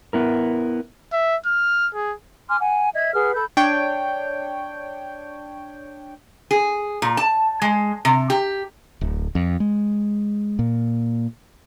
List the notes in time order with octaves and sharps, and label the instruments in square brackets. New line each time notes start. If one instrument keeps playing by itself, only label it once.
[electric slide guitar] B3 E4 A#4
[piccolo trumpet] E5
F6
G#4
[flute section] G#5 C6 D6 F6
F#5 G#5
D#5 E5 G#6
G#4 B4 F#5 F6
A4 B5 G6
[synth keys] D4 C#5 G5
[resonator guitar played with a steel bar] G#4
A#2
A5
G#3
C3
G4
[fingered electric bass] D1
F2
G#3
A#2